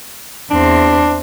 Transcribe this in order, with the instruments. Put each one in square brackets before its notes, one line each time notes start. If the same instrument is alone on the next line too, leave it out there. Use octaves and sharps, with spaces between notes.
[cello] E2 C4 [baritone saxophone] D4